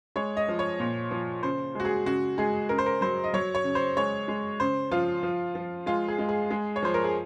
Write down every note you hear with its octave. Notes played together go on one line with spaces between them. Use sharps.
G#3 C#5
D#5
F3
C#5
A#2
F3
C#3 C5
G#3 F#4
G#4
C#3 F#4
G#3 G#4
C#3 A#4
C5
A#4
F#3 C5
D#5
F#3 C#5
C#5
C#3
C5
G#3 C#5
G#3
C#3 C5
F3 F4
F3
F3
G#3 F4
G#4
G#3
G#4
G#3
C#5
F3 C5
A#4
G#4